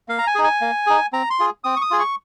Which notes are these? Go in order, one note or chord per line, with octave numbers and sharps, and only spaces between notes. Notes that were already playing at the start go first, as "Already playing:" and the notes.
A#3 F5
A#5
G#5
D#4 G#4
G#5
A#3
D#4 G#4
C4 A#5
C6
F4 G#4
C4 D#6
C#6
D#6
F4 G#4
C#6